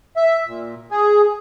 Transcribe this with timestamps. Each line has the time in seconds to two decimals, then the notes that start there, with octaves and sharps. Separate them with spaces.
0.16 E5
0.47 A#2
0.91 G#4